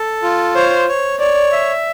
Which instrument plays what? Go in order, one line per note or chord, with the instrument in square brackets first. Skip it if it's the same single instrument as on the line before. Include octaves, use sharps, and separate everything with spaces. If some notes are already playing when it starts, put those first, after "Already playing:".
Already playing: [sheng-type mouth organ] A4
F4
[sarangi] C5 [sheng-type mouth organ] C#5
[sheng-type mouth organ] C#5
[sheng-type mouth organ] C#5 [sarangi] D5
[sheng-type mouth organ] E5